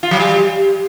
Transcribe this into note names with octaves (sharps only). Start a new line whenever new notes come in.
F4
F#3
G3